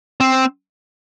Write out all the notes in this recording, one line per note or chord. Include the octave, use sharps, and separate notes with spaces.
C4